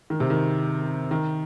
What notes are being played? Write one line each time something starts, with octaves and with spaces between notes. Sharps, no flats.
D#3
C3
D#3
D#3